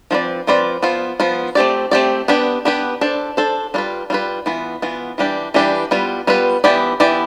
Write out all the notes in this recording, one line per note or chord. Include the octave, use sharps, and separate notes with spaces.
F3 C4 F4 B4 D5
F3 C4 F4 B4 D5
F3 B3 F4
F3 B3 F4
A3 C4 G4 D5
A3 C4 G4 D5
B3 D4 G4 B4
B3 D4 G4 B4
D4 A4 C5
D4 A4 C5
G3 D4 F4 B4
G3 D4 F4 B4
E3 B3 F4
E3 B3 F4
E3 G3 D4 G4 B4
E3 G3 D4 G4 B4
G3 B3 F4 B4
G3 B3 F4 B4
E3 B3 E4 G4 D5
E3 B3 E4 G4 D5